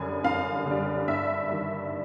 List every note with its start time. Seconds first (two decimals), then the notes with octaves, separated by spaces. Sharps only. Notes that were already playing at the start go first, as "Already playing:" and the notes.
Already playing: F#2 D3 G3 G#5
0.24 F#2 F5
0.66 D3 G3
1.07 G2 E5
1.49 D#3 G3